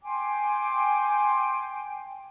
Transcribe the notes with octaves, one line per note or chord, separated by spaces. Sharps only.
G5 G#5 C6 D6